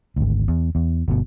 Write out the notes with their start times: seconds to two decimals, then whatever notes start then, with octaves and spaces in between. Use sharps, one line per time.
0.16 G#1 D2
0.48 E2
0.75 E2
1.08 G1 B2